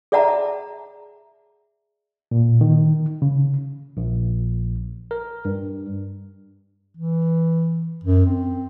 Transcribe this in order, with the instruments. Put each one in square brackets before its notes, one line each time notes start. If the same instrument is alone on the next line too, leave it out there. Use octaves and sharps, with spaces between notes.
[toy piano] G#4 D5 E5 F#5 A5 A#5
[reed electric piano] A#2
D#3
C#3
[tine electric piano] A#1
A#4
G2
[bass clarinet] E3
F#2
C4